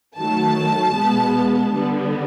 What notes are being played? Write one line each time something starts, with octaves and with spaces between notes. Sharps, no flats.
D#3 F#3 A3 A5
B2 G#3 B3
D3 G3 B3